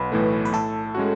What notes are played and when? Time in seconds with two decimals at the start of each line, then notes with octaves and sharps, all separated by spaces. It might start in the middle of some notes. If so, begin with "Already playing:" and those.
Already playing: B1 B3 B4
0.12 A2 E3 A3
0.45 B4
0.53 A2 A4
0.95 G#3 C#4 F#4